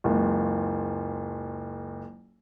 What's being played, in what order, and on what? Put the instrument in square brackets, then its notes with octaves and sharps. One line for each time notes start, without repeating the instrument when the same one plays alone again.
[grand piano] F#1 C#2